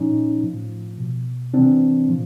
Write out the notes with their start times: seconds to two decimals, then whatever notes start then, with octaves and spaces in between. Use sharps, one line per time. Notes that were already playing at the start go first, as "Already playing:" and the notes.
Already playing: A#2 F3 C#4 D#4
0.43 A2 F3
0.98 B2
1.53 C3 E3 C4 D4
2.08 A#2 F3